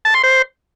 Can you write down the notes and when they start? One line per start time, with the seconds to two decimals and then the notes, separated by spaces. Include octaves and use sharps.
0.05 A5
0.14 C6
0.23 C5